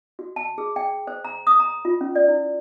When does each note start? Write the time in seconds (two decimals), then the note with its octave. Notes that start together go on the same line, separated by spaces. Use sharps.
0.19 F#4
0.36 A5
0.58 G#4
0.76 G5
1.07 C5
1.25 A#5
1.47 D#6
1.60 A#5
1.85 F4
2.01 C#4
2.16 D5
2.28 E4